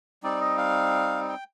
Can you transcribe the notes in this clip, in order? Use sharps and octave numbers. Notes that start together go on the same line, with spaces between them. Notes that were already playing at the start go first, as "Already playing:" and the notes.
G3 C4 D#4 D5
D#5
F5
G5